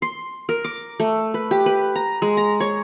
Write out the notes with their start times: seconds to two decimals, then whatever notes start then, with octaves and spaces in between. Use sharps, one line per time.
0.02 C6
0.49 A#4
0.64 D6
1.00 A3
1.34 B4
1.51 G4
1.66 B4
1.95 A#5
2.22 G#3
2.37 A#5
2.60 C#5